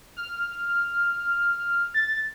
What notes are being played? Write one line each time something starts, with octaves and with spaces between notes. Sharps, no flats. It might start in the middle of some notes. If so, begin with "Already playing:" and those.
F6
A6